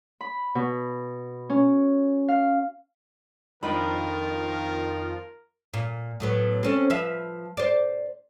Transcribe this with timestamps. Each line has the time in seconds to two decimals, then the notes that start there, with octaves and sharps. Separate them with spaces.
0.21 B5
0.55 B2
1.50 C#4
2.28 F5
3.63 F2 D#3 F3 D4 F4 A#4 D#5 B5
5.74 A#2
6.20 A2 F#3 B3
6.63 C4 C#4 A4
6.90 F3 B4 E5
7.57 C5 D5